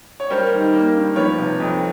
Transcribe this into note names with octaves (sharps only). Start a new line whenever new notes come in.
C#5
G3 A#4 C5
D#3
A#3
G2
F3 B4 C#5
C3
F2